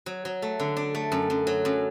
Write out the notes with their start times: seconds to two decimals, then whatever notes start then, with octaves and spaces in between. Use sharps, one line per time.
0.06 F#3
0.25 F#3
0.42 A3
0.60 D3
0.77 D4
0.95 A3
1.12 F#2
1.30 F#2
1.47 F#3
1.65 F#2